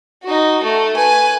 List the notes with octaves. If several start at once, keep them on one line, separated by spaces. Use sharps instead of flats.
D#4 F#4
A3
B4 G#5